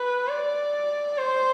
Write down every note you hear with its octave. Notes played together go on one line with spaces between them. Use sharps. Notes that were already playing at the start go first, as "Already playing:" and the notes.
Already playing: B4
D5
C5